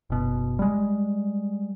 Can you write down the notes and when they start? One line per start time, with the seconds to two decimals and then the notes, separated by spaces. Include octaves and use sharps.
0.10 F#1 B2
0.59 G3 G#3